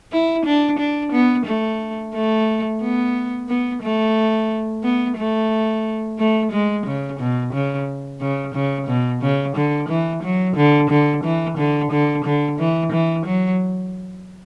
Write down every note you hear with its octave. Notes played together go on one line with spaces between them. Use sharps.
E4
D4
D4
B3
A3
A3
B3
B3
A3
B3
A3
A3
G#3
C#3
B2
C#3
C#3
C#3
B2
C#3
D3
E3
F#3
D3
D3
E3
D3
D3
D3
E3
E3
F#3